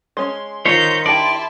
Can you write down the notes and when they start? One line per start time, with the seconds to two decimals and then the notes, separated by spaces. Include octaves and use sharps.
0.17 G#3 C#4 C6
0.65 D#3 F4 C5 C#5 G6
1.06 D4 E4 G4 D5 A5